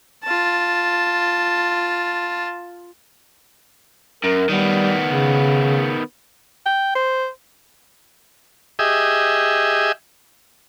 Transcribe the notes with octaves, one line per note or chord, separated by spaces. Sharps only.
F4 A5
F#2 A#4
D#3 G3 B3
C#3
G5
C5
G4 G#4 D#5 E5